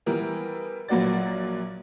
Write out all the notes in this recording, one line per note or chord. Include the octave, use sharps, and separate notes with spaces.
E3 G3 B3 E4 G4 A#4
A#1 F#3 A#3 F#4 D5 A6